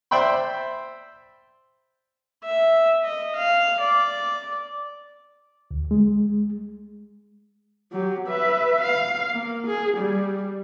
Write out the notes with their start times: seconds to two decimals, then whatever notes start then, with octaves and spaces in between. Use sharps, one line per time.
0.11 C5 D5 E5 G5 B5 C6
2.44 E5
3.04 D#5
3.36 F5
3.81 D5
5.71 D2
5.91 G#3
7.92 F#3 G4
8.28 B4 E5
8.82 F5
9.33 A#3
9.67 G#4
9.98 G3